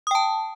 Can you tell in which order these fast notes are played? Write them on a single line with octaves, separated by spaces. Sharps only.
D#6 G5 A5